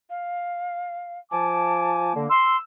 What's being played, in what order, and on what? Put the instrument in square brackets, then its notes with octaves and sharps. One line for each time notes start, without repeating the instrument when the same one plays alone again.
[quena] F5
[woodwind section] F3 G#5 D6 [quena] A5
[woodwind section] D3 A#3
[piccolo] C6 [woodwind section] E6